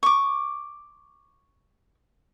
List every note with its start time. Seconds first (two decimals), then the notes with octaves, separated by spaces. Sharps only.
0.03 C#6 D6